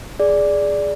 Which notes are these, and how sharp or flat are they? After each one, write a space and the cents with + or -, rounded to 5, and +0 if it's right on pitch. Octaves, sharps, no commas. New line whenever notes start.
G#4 +0 D5 -5